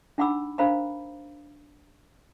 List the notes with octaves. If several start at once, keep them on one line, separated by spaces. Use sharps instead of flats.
D4 D#4 F#5 B5 D6 E6
D4 A#4 C5 F5 A#5 B5